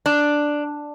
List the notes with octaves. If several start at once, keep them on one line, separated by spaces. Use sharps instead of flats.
D4